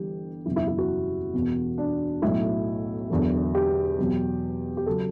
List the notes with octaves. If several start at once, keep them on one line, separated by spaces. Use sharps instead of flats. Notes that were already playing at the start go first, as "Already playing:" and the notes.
Already playing: G1 G2 E3 G4
F#1 E2 B2 F#3 E4
E4
E4
F#4
E1 E2 B2
D4
B1 A2 F#3 E4
E1 E2 D3 F#3
G4
E2 B2 F#3
G4
C#3 F#3 A4